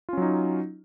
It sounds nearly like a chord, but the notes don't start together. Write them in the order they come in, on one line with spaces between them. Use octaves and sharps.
F4 C#4 F#3 D#4